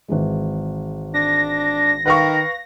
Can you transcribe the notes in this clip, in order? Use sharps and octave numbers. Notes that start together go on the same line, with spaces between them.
G#1 E3 G#3
D4 A#6
D#3 B4 F5 C#6